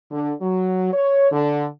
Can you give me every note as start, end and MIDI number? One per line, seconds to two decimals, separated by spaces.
0.11 0.32 50
0.41 0.93 54
0.94 1.32 73
1.32 1.65 50